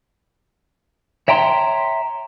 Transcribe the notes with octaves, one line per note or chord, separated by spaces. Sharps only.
C#5 E5 G5 A#5 C6